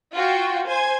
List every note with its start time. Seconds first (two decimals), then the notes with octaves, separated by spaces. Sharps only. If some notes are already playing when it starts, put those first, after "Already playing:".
0.14 F4 F#4 G5
0.68 C5 G#5